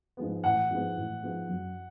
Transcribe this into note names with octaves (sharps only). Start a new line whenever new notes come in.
G#2 F3 G#3 B3
A1 F#5
G#2 F3 G#3 B3
A1
G#2 F3 G#3 B3
F#2